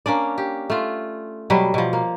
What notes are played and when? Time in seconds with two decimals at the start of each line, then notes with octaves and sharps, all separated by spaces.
0.06 A#3 C#4 D4 D5
0.38 G4
0.70 A3 F4
1.50 B2 F#3 G3 B4
1.74 B2 F3
1.93 A#3